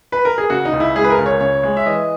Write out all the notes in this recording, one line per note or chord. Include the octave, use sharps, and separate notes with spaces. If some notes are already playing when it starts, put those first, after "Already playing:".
B4
A#4
G#4
C#3 F#4
D#4
C#2
E4
G#3 G#4
B4
A#4
C#2
C#5
C#3 C#5
G#3
E5
E3 D#5